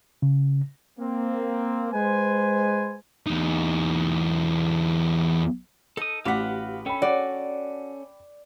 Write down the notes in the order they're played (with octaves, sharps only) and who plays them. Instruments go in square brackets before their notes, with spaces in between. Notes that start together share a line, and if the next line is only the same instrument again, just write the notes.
[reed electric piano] C#3
[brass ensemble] A#3 C4
G#3 B4 C5 G#5
[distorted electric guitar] E2 D#4
[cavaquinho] D#4 [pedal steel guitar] A4 D#6
[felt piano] A1 D6 B6 [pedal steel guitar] F#4 G4 F5 [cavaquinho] B4 F#5
[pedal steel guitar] C#4 A4 [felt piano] G5 B5
[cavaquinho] F#4 [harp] D5